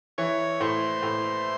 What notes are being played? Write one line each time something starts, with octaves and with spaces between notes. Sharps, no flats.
E3 C#5
A2 C5
A2